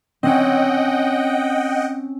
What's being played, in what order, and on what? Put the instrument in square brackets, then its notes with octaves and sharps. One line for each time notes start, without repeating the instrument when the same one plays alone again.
[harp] C4 C#4 [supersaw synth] D#5 F#5 G5